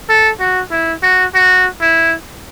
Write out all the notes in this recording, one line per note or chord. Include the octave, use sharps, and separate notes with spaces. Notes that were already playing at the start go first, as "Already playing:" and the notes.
A4
F#4
E4
F#4
F#4
E4